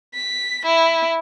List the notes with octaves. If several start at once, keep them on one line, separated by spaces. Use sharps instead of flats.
B6
E4